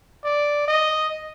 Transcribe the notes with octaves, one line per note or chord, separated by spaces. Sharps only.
D5
D#5